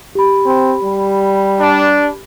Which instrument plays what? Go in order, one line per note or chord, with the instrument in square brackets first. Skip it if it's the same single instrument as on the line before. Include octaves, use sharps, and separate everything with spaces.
[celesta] G4 B5
[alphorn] C4
G3
[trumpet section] D4